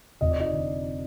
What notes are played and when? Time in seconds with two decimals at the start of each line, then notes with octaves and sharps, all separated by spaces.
0.21 F1 D#5
0.31 D5
0.40 D#4 D#5
0.53 D3